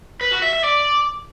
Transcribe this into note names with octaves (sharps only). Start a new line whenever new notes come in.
B4
F#4
E5
E5
D5